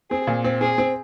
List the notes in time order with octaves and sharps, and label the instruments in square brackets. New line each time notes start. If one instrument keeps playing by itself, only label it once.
[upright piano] C4 [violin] G#4
[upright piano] A#2
C4
[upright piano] C4 [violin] G#4
[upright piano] C4